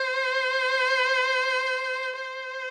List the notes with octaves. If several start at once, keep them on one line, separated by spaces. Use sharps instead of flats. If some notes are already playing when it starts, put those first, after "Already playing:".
Already playing: C5
C5